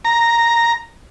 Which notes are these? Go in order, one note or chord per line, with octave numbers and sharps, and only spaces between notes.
A#5